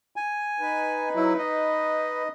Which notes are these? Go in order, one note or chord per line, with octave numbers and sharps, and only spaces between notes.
G#5
D#4 B4
F#3 E4
D#5